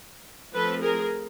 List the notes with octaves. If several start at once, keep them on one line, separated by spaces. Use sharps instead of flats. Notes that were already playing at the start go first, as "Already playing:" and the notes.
F3 A3 C4 A4 B4
G#4 A#4